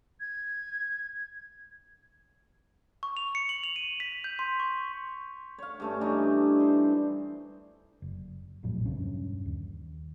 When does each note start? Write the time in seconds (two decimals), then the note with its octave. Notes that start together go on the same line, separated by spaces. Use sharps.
0.20 G#6
3.03 C#6
3.17 F7
3.35 C#7
3.49 F#7
3.64 F7
3.76 D#7
4.00 B6
4.24 G6
4.39 C6
4.60 C#6
5.58 C#5 F5
5.80 G2 A3 C#4
6.01 E3 D4 D#4
6.60 C5
8.02 F#1
8.63 A#1 F2 A2 F#3
8.86 E1 G2 C#3 C#4
9.45 D#2